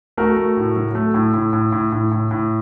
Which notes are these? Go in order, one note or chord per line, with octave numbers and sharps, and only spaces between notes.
A3 F#4 A#4
A3
A2
F#3
A3
A2
A2
A2
A2
A2
A2
A2